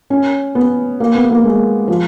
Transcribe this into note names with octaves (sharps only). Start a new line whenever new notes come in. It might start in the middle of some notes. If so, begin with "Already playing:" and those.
C#4
B3
A#3
B3
A#3
G#3
F3